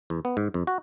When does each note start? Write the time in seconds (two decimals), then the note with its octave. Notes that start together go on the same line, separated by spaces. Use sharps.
0.10 E2
0.25 B3
0.37 G#2
0.54 F2
0.67 F#4